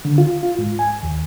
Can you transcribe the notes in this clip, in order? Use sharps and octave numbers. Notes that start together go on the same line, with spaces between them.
D3
F4
F4
G#2
G#5
D#2